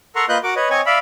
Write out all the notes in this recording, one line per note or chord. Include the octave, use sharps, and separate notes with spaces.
A4 A#4 F#5 A#5 C6 C#6
A#3 F4 B4 D#5 F#6 G6
F#4 A#4 F#5 D6
B4 C#5 D#5
C4 C#5 D#5 G#5 C#6
D5 E5 F5 B5